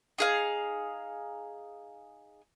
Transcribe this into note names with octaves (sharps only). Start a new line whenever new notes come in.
D#4 G#4 F5